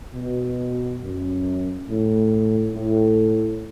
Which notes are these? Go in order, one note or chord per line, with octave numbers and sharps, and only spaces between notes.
B2
F#2
A2
A2